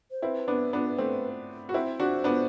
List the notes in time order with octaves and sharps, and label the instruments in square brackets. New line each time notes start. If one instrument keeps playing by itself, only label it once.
[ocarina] C5
[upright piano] C4 E4 [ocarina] B4
[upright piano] B3 D4
B3 D4
A3 C4
F#4
[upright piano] C4 E4 [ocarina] C5
[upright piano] D4 F#4
B3 D4